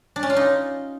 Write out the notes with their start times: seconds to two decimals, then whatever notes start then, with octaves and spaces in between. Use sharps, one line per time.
0.16 D4
0.23 C#4
0.30 F4
0.36 D#4